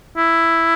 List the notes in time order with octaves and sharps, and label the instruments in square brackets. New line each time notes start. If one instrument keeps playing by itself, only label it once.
[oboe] E4